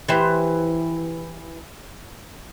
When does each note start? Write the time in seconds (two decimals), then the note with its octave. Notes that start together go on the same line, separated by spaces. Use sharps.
0.08 E3 G4 C5